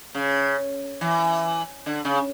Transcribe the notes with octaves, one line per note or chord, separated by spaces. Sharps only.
C#3
E3
D3
C#3